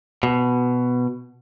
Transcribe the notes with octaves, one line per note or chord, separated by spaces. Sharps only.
B2